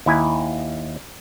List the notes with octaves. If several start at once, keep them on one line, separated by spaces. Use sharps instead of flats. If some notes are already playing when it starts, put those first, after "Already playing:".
D#2 E4 G#5 A#5